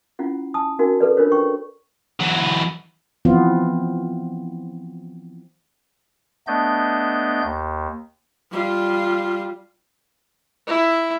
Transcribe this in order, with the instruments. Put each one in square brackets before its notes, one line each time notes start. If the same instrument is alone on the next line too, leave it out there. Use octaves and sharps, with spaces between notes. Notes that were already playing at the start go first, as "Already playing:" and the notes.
[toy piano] C#4 E4 F4 F#5
G#5 A5 D#6
C#4 D#4 F#4 A#4 G#5
G#4 A4 B4 D5
D4 F4 A#4 C5 C#5
C#5 G5 C#6
[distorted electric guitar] E3 F#3
[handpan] E3 F3 B3 C4 F4
[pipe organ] A3 B3 D4 D#5 G6
D#2
[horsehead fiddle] G3 F4
[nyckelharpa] E4